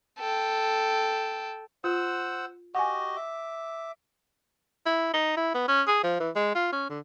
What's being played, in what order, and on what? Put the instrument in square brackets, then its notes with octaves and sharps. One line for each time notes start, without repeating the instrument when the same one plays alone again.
[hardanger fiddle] A4 G5
[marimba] F4 [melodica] C5 F#5 E6
[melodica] F#4 G4 D#5 [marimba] F#5 G#5
[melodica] E5 D6
[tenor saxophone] E4
D#4
E4
B3
C#4
G#4
F3
E3
G#3
F4
C#4
D3